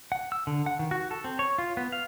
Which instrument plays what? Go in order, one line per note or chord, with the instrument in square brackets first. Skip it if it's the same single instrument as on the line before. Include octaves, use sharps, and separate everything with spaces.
[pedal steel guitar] F#5
E6
D3
F#5
D#3
F#4
A4
C4
C#5
F4
B3
F5